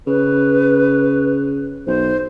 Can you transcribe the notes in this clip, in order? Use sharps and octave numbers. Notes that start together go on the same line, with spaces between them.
C#3 B4
B1 C5